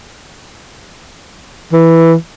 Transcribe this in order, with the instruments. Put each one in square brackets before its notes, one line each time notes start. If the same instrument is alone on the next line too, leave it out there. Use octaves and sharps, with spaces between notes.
[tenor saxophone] E3